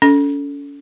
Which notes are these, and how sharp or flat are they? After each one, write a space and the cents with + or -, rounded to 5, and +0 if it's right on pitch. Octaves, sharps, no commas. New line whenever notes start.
C#4 +40 A4 +0